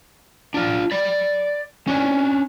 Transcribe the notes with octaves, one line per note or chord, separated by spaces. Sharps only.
D4 F4
D5 B5
C#4 D4